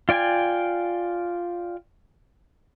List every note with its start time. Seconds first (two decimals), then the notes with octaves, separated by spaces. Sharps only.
0.09 F4 D5 G5 G#5